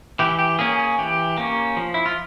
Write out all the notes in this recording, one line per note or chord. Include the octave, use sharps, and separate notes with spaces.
E3 G4
G4
A#3 C#4 G#4
G#4
E3 G4
A#3 C#4
F3
E4
F4